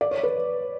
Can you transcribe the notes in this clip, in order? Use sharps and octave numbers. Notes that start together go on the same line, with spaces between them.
D5
C#5
B4